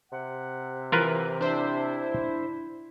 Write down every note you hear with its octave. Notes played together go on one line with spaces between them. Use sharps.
C3 F#5
E3 F4 A#4 B4
D4 E4 C5 E5